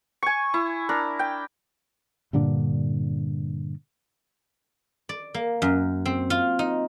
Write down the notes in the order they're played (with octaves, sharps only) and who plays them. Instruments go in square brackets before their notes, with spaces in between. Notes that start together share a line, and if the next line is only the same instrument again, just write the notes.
[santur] G#5 C#6
E4
D4 A#4
G5
[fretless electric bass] G2 A#2 D3 D4
[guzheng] D5
A#3
F#2
C4
F4
D#4